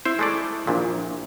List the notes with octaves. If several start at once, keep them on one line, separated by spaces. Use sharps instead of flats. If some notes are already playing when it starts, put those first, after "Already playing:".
E4 C5
G#3 A3 D5
A#1 A#2